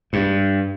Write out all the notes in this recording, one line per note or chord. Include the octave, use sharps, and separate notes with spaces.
G2